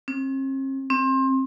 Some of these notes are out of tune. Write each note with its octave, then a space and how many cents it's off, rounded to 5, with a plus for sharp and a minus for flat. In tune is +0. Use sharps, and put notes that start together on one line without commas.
C4 +45
C4 +25